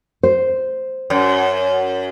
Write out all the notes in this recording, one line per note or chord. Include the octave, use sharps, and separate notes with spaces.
C5
F#2